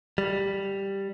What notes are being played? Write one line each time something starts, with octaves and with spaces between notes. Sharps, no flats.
G3